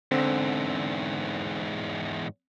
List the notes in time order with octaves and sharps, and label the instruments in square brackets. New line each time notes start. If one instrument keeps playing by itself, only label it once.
[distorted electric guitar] E2 G#2 [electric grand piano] D3 C4